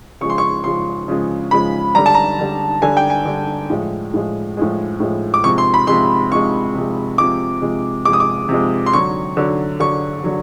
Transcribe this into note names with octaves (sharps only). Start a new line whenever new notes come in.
C#3 F3 G#3 C#6
C6
C#6
C#3 F3 G#3 C6
C#3 F3 G#3
C#3 F3 G#3 B5
D3 G3 A#5
A5
A#5
D3 G3
D3 G3 G#5
G5
G#5
D3 G3
A2 F3 G#3
A2 F3 G#3
A2 F3 G#3
A2 F3 G#3
D6
C3 F3 G#3 C#6
C6
B5
C3 F3 G#3 C6
C3 F3 G#3 C#6
C3 F3 G#3
C3 F3 G#3 D6
C3 F3 G#3
C3 F3 G#3 D6
D#6
D6
C3 F3 G#3
C6
D3 F#3 C#6
D3 F#3
D3 F#3 C#6
D3 F#3